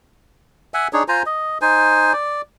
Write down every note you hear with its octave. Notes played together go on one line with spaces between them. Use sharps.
E5 F#5 G#5
D4 D#4 G#4 C#5
F4 C5 G#5 A#5
D#5
D#4 C5 G#5
D5